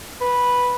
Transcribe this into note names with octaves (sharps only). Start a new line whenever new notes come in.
B4